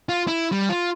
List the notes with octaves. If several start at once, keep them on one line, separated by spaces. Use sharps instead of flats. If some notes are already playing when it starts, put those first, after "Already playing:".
F4
E4
G3
F4